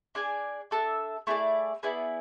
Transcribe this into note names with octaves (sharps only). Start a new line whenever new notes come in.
D4 G#4 D5 G#5
D4 A4 E5 A5
A3 E4 G#4 D5
B3 E4 G#4 D5